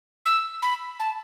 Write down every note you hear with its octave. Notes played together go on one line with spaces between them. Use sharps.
E6
B5
A5